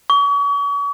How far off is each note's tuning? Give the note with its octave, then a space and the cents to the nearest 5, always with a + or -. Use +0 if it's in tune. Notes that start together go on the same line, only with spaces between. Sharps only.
C#6 +40